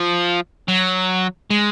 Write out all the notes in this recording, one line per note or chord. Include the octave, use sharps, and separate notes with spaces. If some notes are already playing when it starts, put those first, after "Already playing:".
Already playing: F3
F#3
G#3